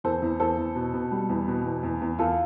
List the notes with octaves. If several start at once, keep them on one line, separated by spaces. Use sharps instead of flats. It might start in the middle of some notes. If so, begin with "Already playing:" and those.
E2 A4 C5
E2
E2 A4 C5
E2
B2
B2
G3
E2
B2
E2
E2
E2
E2 F4 A4